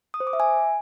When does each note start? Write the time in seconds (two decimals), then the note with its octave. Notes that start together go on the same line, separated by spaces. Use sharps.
0.14 D#6
0.20 C5
0.27 D6
0.33 E5
0.40 G#5